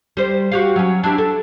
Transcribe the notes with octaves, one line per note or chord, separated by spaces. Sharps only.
G3 C5
F#4 G4 F5
F#3 C#4
D4 E4 G4
A4